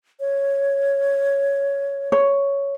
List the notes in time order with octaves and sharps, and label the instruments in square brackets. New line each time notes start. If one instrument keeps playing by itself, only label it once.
[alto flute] C#5
[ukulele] C#5